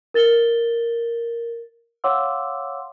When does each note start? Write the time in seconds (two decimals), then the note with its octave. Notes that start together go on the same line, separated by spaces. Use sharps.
0.14 A#4 A6 G7
2.04 C#5 F5 F#5 C6 D6 E6